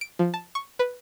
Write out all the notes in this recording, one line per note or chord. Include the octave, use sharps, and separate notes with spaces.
D7
F3
A5
C#6
B4